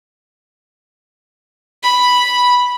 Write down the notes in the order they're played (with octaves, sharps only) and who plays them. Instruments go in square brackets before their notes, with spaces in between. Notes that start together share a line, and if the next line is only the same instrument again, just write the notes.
[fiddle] B5